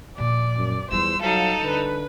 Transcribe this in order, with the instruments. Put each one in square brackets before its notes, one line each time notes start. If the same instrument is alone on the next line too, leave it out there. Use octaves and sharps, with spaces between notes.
[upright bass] A#2 F3 [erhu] D5
[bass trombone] F#2
[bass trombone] E2 [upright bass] G3 F4 [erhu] C5 [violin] E6
[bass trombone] F#3 [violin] D#4 A4 [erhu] F5
[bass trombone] D3 [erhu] B4